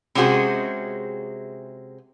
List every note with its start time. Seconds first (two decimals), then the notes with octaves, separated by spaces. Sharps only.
0.15 C3 G#3 C#4 F#4 G#4 C5